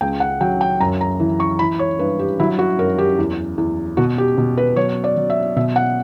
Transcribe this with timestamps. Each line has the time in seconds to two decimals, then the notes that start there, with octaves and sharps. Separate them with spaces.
0.01 C#2 G5
0.20 F#5
0.41 F#3 G5
0.61 G5
0.81 F#2 A#5
1.01 A#5
1.20 E3
1.40 C#6
1.59 E3 B5
1.79 C#5
1.99 G2 B4
2.19 G4
2.40 F#3 E4
2.59 F#4
2.78 F#2 A#4
2.98 G4
3.18 E2
3.58 E2
3.97 B2 F#4
4.18 G4
4.38 B2
4.57 B4
4.76 F#3 C#5
5.04 D5
5.17 F#3
5.30 E5
5.56 B2 E5
5.76 F#5